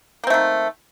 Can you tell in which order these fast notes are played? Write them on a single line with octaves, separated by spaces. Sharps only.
A#3 C4 A3 D#3